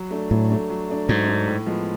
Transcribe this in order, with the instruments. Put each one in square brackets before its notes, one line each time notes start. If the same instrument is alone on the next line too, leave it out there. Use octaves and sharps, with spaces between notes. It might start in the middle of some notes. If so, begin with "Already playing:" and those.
Already playing: [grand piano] F#3
A3 D4
[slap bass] A2 [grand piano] F#3
[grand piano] A3 D4
F#3
A3 D4
[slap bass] G#2 [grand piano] F#3
[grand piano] A3 D4
A2
F3 G#3 B3